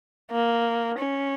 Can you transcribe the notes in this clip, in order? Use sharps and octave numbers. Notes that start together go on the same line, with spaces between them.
A#3
C#4